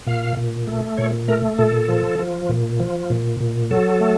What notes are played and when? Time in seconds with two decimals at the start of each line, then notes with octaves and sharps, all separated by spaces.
0.07 A#2 F5
0.37 A#2
0.67 A3
0.97 A#2 C#5
1.28 A3 A#4
1.59 A#2 A4
1.89 F3
2.19 F3
2.49 A#2
2.80 F3
3.10 A#2
3.40 A#2
3.71 F#3 A4
4.01 A3